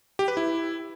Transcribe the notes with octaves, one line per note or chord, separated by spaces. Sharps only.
G4
B4
E4